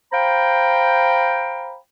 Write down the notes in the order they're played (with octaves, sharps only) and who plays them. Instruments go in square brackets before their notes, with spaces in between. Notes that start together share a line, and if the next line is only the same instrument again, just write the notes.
[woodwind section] C5 F5 G5 A#5 B5